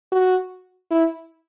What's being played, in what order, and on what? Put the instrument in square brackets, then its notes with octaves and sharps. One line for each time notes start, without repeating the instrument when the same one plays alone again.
[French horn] F#4
E4